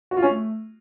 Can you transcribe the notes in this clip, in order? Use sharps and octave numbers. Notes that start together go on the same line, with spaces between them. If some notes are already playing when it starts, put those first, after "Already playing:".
F#4
F4
C#4
A3